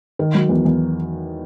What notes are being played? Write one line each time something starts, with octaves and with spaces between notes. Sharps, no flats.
D#3
F#3
E2
E2